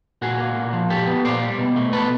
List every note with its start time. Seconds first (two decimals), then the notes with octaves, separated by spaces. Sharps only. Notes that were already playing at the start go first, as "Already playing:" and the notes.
0.22 A#2 F#4 G#4
0.39 A#3
0.56 A#2
0.73 F3
0.89 A#2 G4 A4
1.07 B3
1.25 A#2 C5 D5
1.42 G3
1.58 B2
1.76 A3
1.92 B2 A4 B4